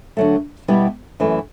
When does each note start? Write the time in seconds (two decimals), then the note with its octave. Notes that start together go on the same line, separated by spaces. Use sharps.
0.17 D3 F#3 A3
0.68 B2 G3 B3 E4 G4
1.20 F#2 E3 A3